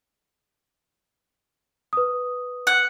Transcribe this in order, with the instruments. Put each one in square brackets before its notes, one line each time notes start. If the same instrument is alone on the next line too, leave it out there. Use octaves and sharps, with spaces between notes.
[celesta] B4 D#6
[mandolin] F#5